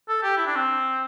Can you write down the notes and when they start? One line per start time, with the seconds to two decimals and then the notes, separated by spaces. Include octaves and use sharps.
0.09 A4
0.23 G4
0.37 E4
0.46 D4
0.56 C4